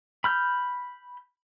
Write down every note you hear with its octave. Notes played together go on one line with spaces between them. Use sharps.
B5 F6 G6